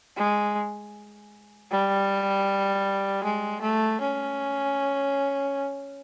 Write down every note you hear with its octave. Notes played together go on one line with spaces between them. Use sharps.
G#3
G3
G#3
A3
C#4